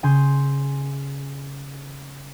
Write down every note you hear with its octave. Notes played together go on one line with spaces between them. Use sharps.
C#3 G#5 C6 G6